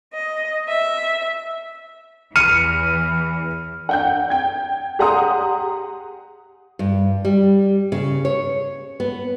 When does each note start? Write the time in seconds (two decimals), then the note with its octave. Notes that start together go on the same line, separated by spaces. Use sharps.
0.14 D#5
0.69 E5
2.36 E2 E3 F6 C#7 D#7
3.89 F#5 G5 G6
4.30 G5 G#6
4.99 G4 G#4 F#5 A#5 C6 D#6
6.79 G2
7.25 G3
7.92 C#3
8.25 C#5
9.00 B3